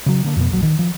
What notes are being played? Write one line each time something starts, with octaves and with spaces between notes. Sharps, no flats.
C#3 F#3
D3 A#3 D4
F2 B2 B3
D#1 A#1 F#3
D#3
F3